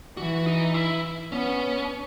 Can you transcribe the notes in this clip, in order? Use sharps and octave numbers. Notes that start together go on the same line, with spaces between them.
E3 F#4
D#4
E4
B3 C#4